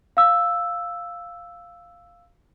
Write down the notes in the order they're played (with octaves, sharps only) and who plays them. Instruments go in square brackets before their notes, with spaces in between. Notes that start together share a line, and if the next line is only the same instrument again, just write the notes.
[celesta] F5 E6